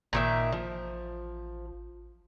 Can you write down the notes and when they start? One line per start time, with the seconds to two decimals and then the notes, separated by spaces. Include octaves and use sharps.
0.13 A1 A#2 D#3 E5
0.52 F3